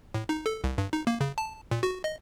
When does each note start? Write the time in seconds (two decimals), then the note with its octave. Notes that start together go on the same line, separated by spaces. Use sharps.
0.14 A2
0.29 D#4
0.46 A4
0.64 C2
0.78 G2
0.93 D#4
1.07 A#3
1.21 C#3
1.38 A5
1.71 A#2
1.83 F#4
2.04 D#5